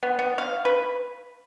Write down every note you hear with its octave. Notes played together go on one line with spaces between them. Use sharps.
B3
B3
F5
B4